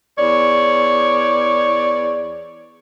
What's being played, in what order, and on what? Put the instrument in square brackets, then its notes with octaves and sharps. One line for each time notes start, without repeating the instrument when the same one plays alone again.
[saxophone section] E2 C#5 D5